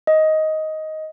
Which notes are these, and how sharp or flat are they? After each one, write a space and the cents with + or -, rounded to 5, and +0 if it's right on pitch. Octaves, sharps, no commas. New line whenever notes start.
D#5 +10